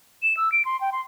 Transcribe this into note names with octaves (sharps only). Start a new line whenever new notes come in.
E7
E6
D7
C6
G5
C6